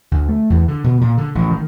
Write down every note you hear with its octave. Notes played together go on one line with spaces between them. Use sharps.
D2
A3
E2
D3
B2
A#2
D3
A1
D#3